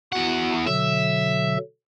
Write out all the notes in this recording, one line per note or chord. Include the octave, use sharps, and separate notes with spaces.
E2 F#4 F#5
B2 D3 F#3 E5